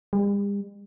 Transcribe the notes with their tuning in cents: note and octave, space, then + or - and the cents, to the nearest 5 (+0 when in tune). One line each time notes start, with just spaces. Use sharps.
G3 +45